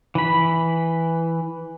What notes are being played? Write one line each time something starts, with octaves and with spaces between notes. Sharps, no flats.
E3 B5